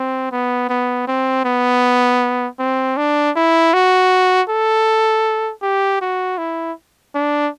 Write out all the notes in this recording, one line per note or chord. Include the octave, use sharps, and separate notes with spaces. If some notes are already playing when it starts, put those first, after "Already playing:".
Already playing: C4
B3
B3
C4
B3
C4
D4
E4
F#4
A4
G4
F#4
E4
D4